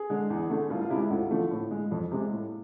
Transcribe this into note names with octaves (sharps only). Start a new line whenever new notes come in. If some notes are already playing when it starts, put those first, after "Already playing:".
Already playing: G#4
D3 G#3
E2
D3 A3
C2 F4
F4
C3 G#3 E4
E4
D2 F4
D3 F3 A3
A2
G#3
F2
C3 G#3
A2